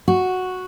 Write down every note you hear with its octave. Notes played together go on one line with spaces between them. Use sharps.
F#4